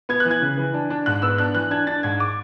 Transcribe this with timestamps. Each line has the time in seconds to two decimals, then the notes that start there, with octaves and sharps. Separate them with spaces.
0.09 B3 G#6
0.20 E3 F#6
0.31 G#6
0.42 C#3
0.57 E3
0.74 D4
0.90 D4
1.06 G#2 F#6
1.22 B3 E6
1.38 D4 F#6
1.55 E3 F#6
1.71 D4 G#6
1.87 D4 A6
2.03 G#2 G#6
2.20 D6